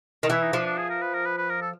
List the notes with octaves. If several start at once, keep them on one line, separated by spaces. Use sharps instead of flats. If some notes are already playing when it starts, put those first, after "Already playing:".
D#3
E3 E4
D#4
F3 D4
D4
G#4
A#4
B4
A#4
B4
B4
A#4
A4